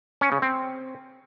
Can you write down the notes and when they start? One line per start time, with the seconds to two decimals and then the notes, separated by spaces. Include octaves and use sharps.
0.21 C#4
0.32 C#3
0.42 C4